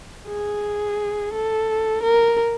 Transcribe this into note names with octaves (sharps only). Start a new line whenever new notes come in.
G#4
A4
A#4